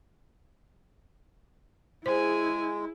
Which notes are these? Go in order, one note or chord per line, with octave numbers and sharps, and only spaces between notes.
G#3 E4 G#4 C5 G#5